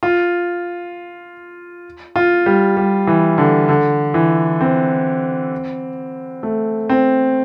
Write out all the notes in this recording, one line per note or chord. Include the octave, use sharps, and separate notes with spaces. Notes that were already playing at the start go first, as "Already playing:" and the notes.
F4
F4
G3
G3
E3
D3
D3
E3
C4
A3
C4